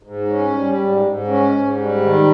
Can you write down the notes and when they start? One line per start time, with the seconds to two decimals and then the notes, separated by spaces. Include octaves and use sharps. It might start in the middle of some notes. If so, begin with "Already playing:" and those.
0.03 G#2
0.28 C#4
0.53 G3
0.77 G#2
1.03 G#2
1.27 C#4
1.52 G#2
1.77 G3
2.02 D#3